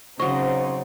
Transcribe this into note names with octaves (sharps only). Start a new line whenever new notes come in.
C#3 F#3 C4 D#4 C5 D#5 C#6